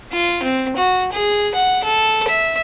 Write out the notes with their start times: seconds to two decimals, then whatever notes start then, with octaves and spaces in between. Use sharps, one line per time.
0.12 F4
0.43 C4
0.77 F#4
1.13 G#4
1.55 F#5
1.84 A4
2.28 E5